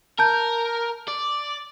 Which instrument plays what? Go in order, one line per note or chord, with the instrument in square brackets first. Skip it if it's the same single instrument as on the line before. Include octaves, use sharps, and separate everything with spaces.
[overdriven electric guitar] A#4 [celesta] A5 G6
[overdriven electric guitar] D5